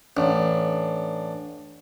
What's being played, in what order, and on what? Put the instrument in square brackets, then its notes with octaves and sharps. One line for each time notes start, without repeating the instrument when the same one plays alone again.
[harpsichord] A1 [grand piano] D4